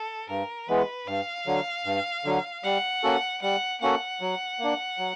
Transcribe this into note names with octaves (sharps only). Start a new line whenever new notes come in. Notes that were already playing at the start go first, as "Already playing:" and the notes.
Already playing: A4
G2 A#4
E3 G#3 B3 B4
G2 F5
D3 F#3
G2
D3 F#3
G3 F#5
A#3 C#4 F#4 A4
G3 F#5
A#3 C#4 F#4 A4 F#5
F#3
A#3 D4
F#3